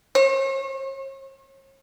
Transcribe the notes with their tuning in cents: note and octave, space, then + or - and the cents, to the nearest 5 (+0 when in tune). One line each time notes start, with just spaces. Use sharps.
C#5 -45